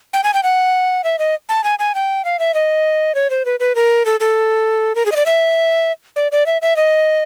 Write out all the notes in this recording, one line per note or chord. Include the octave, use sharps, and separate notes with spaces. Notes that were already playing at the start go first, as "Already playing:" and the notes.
G5
G#5
G5
F#5
E5
D#5
A5
G#5
G#5
G5
F5
E5
D#5
C#5
C5
B4
B4
A#4
A4
A4
A#4
G#4
D#5
D5
E5
D5
D5
E5
E5
D#5